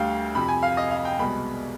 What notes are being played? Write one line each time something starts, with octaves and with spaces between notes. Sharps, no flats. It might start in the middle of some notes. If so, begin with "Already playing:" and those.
Already playing: D2 D3 G3 F5 G5
F2 C3 F3 B5
G#5
F5
D#5
F5
G5
C2 B2 G#3 B5